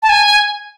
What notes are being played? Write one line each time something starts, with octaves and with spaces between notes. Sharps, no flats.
A5
G#5